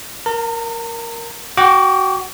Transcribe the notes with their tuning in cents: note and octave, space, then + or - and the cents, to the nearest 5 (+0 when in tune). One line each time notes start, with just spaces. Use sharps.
A#4 +0 A#5 -40
F#4 +15 G5 +0 D6 -15